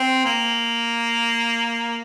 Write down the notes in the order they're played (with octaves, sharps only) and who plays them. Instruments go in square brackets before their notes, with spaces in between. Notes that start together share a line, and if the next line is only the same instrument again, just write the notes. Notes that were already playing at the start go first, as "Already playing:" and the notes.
Already playing: [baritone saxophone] C4
A#3